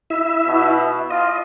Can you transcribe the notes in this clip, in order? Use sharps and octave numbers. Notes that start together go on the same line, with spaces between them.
E4 E5
B2
F4 D#5